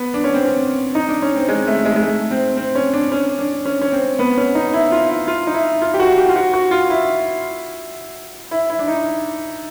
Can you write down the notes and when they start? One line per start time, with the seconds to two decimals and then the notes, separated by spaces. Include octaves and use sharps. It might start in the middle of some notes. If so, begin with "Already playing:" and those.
Already playing: B3
0.14 D4
0.24 C#4
0.34 C4
0.45 C#4
0.95 D#4
1.09 D4
1.22 C#4
1.36 C4
1.49 G#3
1.67 A3
1.85 G#3
1.96 G#3
2.03 A3
2.31 C4
2.57 C4
2.75 C#4
2.94 D4
3.12 C#4
3.39 D4
3.65 C#4
3.81 C#4
3.92 C4
4.19 B3
4.37 C#4
4.55 D#4
4.74 E4
4.92 F4
5.10 E4
5.27 F4
5.47 D#4
5.54 E4
5.82 F4
5.94 G4
6.00 F#4
6.17 G4
6.29 F4
6.36 F#4
6.54 F#4
6.71 F4
6.90 E4
8.51 E4
8.70 E4
8.79 D4
8.88 D#4